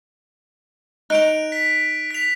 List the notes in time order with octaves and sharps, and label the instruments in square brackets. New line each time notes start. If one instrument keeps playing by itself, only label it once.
[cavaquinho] D#4 [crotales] F#6 D7 F7
[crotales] B6
B6 F7